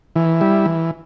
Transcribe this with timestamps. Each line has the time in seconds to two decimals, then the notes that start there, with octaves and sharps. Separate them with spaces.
0.16 E3
0.41 G3 E4
0.66 E3